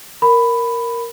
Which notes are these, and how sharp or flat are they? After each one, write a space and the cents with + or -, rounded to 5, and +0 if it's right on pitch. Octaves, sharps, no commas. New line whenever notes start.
A#4 +0 B5 +10